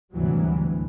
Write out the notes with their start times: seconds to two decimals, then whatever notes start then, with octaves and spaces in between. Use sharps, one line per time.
0.12 D2 G#2 C3 E3 F#3 G3
0.50 D2